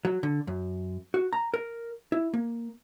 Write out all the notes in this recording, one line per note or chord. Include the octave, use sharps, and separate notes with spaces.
F#3
D3
F#2
F#4
A#5
A#4
E4
A#3